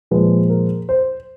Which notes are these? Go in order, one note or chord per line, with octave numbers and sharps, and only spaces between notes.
A#2 F3 G#3 B4
A#4
C5